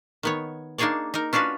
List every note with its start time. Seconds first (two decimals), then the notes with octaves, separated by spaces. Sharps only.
0.23 D#3 B3 C#5
0.78 A#3 D4 D#4 G#4 C#5 D5
1.14 D#4 A#4
1.33 C#4 D4 F4 F#4 B4